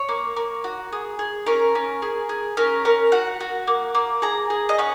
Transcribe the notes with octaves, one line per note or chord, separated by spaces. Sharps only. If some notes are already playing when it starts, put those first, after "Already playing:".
Already playing: C#5
A#3
A#3
F#4
G#4
G#4
C#4 A#4
C#4
G#4
G#4
C#4 A#4
C#4 A#4
F#4 F#5
F#4
A#3
A#3
G#4 A#5
G#4
D#5
C#4 F#5